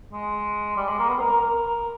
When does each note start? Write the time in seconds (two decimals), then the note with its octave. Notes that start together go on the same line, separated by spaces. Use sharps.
0.13 G#3
0.77 G3
0.88 G#3
0.99 A#3
1.09 B3
1.20 A#4
1.30 A#4
1.41 A#4